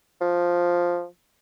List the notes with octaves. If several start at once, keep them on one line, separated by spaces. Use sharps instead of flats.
F3